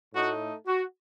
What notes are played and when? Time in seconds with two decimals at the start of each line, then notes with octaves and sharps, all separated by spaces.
0.14 A2 A3 D#4 F#4
0.67 F#4